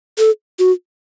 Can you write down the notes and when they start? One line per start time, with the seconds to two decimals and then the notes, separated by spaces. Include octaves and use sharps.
0.18 A4
0.59 F#4